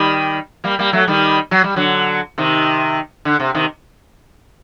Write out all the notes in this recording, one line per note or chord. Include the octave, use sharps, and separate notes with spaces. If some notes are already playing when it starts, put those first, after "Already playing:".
Already playing: D#3 G3
G3 A#3
G3 A#3
F#3 A3
D#3 G3
F#3
G3
D3 F#3
C3 D#3
D3
C3
C3 D#3